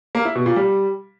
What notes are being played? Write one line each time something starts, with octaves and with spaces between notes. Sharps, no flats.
A#3
E4
B2
A#2
G3